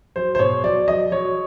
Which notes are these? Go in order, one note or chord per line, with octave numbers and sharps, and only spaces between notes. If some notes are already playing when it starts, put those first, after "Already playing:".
F#3 C5
C5
B2 C#5
F#3 D5
F#3 D#5
F#3 C#5